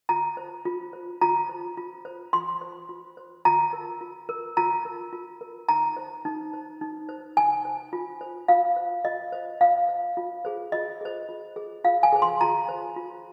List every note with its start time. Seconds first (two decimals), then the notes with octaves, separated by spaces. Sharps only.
0.09 F4 A#5
0.37 C5
0.65 F4
0.93 C5
1.21 F4 A#5
1.49 C5
1.77 F4
2.05 C5
2.33 F4 C6
2.61 C5
2.89 F4
3.17 C5
3.45 F4 A#5
3.73 A#4
4.01 F4
4.29 A#4
4.57 F4 A#5
4.85 A#4
5.13 F4
5.41 A#4
5.69 D#4 A#5
5.97 C5
6.25 D#4
6.53 C5
6.81 D#4
7.09 C5
7.37 D#4 G#5
7.65 C5
7.93 F4
8.21 C5
8.48 F4 F5
8.77 C5
9.05 F4 D#5
9.32 C5
9.61 F4 F5
9.89 C5
10.17 F4
10.45 G#4 C5
10.72 F4 D#5
11.01 G#4 C5
11.29 F4
11.56 G#4 C5
11.84 F4 F5
12.03 G#5
12.13 G#4 C5
12.22 C6
12.41 F4 A#5
12.69 C5
12.96 F4